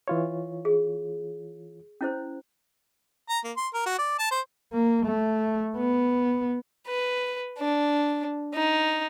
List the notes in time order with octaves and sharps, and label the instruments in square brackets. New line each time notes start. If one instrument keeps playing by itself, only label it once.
[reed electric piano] E3 F4 C#5
[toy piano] G#4
C#4 E4 C5
[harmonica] A#5
A#3
C6
A#4
F#4
D5
A5
C5
[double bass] A#3
A3
B3
[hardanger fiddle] B4
D4
D#4